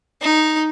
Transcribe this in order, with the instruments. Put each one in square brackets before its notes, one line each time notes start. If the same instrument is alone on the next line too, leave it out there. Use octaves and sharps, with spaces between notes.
[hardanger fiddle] D#4